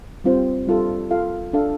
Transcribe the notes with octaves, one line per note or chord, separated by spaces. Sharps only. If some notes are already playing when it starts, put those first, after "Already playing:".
G3 C4 F4 C5
G3 F4 A4
F4 A4 F5
D4 A4 F5